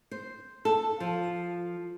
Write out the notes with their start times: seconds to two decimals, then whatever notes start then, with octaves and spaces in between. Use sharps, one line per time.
0.11 C5
0.65 A4
1.00 F3